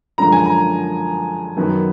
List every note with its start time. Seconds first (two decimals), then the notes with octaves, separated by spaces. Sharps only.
0.18 F#2 D3 F3 G#3 A#5
0.32 G#5
0.46 A#5
1.57 F#2 D#3 F#3 B3